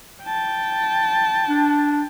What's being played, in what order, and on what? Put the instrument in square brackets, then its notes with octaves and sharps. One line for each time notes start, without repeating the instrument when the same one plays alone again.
[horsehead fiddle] G5 A5
[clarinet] D4